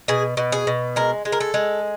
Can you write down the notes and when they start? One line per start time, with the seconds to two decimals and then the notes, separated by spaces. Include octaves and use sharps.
0.08 B2 G#4
0.37 B2
0.52 G#4
0.67 B2
0.96 G#3 A#4
1.25 G#3
1.32 A#4
1.40 A4
1.54 G#3